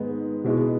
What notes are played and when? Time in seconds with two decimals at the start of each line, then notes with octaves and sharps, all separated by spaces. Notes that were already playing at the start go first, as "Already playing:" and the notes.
Already playing: G#2 D#3 G#3 B3
0.44 B2 G#3 B3 E4